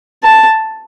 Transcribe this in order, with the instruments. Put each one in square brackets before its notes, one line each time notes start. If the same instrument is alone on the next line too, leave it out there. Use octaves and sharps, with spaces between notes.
[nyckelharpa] A5